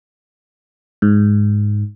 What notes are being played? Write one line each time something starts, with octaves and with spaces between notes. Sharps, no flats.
G#2